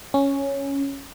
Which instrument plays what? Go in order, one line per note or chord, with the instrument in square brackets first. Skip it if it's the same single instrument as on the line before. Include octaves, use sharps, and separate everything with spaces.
[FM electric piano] C#4